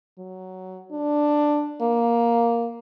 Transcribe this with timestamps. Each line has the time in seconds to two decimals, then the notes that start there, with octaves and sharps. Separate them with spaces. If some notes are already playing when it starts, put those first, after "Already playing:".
0.19 F#3
0.92 D4
1.82 A#3